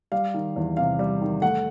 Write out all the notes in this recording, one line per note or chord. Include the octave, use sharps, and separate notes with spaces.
G3 F5
D#3
E2
C3 F5
G3
D#3
A3 F#5